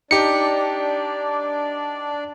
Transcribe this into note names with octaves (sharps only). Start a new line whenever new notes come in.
D4 D#4 G4 D5 C#7